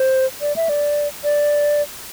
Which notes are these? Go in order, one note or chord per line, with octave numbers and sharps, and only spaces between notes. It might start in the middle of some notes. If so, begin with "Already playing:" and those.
Already playing: C5
D5
E5
D5
D5